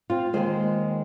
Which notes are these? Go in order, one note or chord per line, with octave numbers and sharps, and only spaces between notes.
C4 F4
D#2 D#3 G#3 G#4 C5